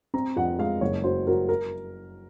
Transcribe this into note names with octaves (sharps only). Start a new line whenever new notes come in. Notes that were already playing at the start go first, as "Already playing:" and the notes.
C4 A#5
F2 F#5
G#3 F5
F#1 C#5
F#3 C5
F#3 A#4
A#4